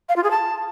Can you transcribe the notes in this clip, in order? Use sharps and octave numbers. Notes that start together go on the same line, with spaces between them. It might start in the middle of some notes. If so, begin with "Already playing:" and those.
F5
F4
G#4
A5